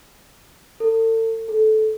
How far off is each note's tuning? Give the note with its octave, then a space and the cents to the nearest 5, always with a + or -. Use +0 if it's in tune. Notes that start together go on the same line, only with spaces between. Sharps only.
A4 +35
A4 -15